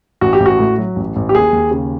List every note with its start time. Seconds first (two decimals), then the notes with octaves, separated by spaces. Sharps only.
0.21 A1 F#4
0.33 G4
0.40 A1
0.46 F#4
0.59 A2
0.78 F#3
0.96 A1
1.16 A1
1.29 G4
1.35 D#2 G#4
1.52 D#2
1.71 C#3